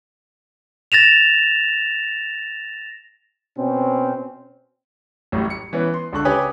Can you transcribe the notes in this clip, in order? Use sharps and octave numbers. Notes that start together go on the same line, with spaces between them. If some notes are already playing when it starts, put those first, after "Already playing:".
A6 A#6 E7 F7
B2 C4 C#4
A1 A2 F#3 G3
C#7
E3 B3 C#4
C6
C#2 D3 A4 C#6 F#6
C#3 G4 B4 C#5 G#5 D#6